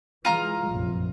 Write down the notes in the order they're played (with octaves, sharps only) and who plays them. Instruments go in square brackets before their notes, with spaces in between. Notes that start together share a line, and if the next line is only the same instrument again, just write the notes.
[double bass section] E3 G#3 [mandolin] F4 A#5 F6
[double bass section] F1 A#1 F#2